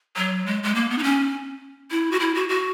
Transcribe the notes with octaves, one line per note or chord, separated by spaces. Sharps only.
F#3
G#3
G#3
A#3
B3
D#4
C#4
E4
F#4
E4
F#4
F#4